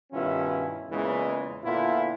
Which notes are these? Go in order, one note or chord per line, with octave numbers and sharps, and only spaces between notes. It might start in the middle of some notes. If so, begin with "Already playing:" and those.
G2 B2 D#3 C#4 E4 F4
E2 A#2 C#3 E3 G#3
A#2 D3 B3 E4 F4